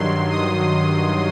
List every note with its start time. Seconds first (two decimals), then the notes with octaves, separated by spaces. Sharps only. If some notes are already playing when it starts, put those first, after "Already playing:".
Already playing: G2 D#3 F#3 C6
0.30 D#6